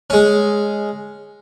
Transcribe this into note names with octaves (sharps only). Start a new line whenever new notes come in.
G#3 C#4